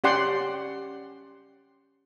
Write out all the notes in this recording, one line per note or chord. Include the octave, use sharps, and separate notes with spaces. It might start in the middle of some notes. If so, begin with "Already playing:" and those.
C#4 G4 D5 F#5 G5 C6